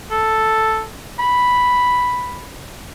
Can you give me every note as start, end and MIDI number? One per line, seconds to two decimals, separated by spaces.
0.11 0.83 69
1.19 2.49 83